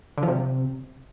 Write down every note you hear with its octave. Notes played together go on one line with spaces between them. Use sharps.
D3
F3
C3